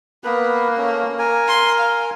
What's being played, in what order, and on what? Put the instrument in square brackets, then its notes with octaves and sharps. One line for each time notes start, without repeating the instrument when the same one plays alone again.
[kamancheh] A#3 [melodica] B3 B4
[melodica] A3 C#4
A#4 G#5
[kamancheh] C6
F5